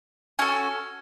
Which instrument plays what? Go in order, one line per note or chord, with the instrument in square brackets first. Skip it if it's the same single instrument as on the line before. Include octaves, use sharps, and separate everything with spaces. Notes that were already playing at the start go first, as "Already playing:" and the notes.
[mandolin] C#4 F#4 A4 G#5